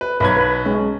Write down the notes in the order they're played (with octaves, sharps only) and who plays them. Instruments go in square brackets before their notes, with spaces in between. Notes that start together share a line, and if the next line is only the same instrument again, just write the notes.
[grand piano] B4
[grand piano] B1 C#5 G#6 [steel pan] B4
[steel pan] B4
G#3 C#4